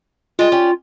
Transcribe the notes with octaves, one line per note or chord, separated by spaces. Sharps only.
G3 G#3 F4
C#4 G4 D5